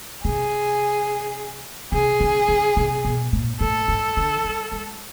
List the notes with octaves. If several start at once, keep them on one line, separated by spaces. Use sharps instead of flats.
C3 G#4
C3 G#4
C#3
C#3
C3
B2
A#2
A2 A4
G#2
D3
G3
G#3